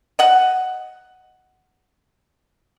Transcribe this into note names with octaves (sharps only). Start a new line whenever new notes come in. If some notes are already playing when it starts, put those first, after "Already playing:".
D#5 F#5